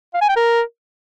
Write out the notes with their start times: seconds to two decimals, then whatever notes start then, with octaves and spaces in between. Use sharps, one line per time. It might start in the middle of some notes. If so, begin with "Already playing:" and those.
0.14 F5
0.21 G#5
0.29 G5
0.36 A#4